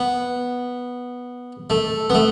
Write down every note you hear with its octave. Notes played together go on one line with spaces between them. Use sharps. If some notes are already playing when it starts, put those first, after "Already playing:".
Already playing: B3
A3
B3
A3